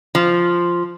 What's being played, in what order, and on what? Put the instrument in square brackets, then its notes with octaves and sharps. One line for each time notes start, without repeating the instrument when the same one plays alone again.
[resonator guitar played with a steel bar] F3